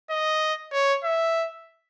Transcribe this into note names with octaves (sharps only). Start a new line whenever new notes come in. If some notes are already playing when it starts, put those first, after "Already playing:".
D#5
C#5
E5